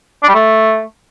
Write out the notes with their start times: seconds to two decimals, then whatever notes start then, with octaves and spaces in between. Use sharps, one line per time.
0.23 D4
0.29 G3
0.34 A3